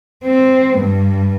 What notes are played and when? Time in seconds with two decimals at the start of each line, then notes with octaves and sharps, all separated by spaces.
0.25 C4
0.79 G2